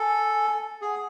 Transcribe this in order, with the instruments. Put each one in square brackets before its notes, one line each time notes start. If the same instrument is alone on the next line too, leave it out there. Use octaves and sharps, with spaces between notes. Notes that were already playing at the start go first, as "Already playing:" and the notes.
Already playing: [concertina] A4 [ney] G#5
[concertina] G#4 [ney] F#5